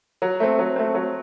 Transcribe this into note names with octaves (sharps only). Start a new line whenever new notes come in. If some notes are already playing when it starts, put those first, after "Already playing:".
F#3
A3 C4
F#3
A3 C4
F#3